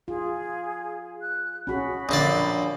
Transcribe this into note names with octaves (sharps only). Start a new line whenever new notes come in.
F4 G#4
F#6
C#4 F#4 G#4 B5
A#1 D3 A#3 C#4 D5